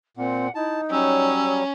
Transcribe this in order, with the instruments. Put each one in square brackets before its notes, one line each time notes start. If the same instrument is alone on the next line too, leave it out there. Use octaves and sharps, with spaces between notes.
[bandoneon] A#2 [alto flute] C4 [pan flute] F#5
[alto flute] D#4 [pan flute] E4 [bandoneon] A5
[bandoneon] F#3 G3 [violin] C#4 [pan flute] E6